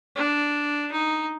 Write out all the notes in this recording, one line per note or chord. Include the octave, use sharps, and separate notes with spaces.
D4
D#4